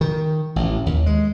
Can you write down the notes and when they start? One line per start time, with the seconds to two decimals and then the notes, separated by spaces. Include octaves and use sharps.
0.01 D#3
0.56 A1
0.86 D#2
1.06 G#3